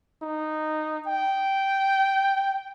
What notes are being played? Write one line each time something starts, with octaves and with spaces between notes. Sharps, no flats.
D#4
G5